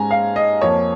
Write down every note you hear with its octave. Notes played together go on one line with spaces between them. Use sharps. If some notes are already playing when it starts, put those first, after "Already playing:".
Already playing: G#2 G#3 C#4 G#5 A#5
F5
D#5
F2 F3 A#3 C#5